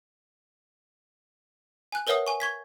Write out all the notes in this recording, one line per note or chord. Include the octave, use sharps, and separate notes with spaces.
G#5 F#6
A#4 B4 C#5 E5 F#5 D#6
G#5 C#6
C#6 G#6 B6